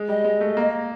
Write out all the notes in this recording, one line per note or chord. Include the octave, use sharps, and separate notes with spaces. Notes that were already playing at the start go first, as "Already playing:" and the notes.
Already playing: G#3
G3 D#5
G#3
A3
A#3